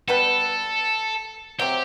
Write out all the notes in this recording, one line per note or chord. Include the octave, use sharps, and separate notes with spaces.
G3 B3 F#4 A4 B4
C3 F#3 C4 G4